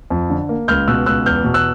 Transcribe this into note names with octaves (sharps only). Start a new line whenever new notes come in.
F2
D3
A#3
C#2 F6 G6
B2 E6 F#6
C#2 E6 F#6
E2 F6 G6
B2
E6 F#6